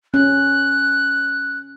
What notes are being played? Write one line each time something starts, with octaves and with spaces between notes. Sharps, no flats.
C#4 F#6